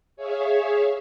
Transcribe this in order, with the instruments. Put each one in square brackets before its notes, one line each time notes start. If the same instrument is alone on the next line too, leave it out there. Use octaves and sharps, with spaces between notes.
[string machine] G#4 C#5 E5 F5